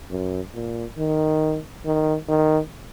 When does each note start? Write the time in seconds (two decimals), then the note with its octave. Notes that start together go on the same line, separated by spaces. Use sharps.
0.10 F#2
0.54 A#2
0.98 D#3
1.85 D#3
2.28 D#3